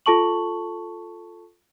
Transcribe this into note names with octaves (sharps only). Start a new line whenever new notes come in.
F4 A4 A5 C#6 F#7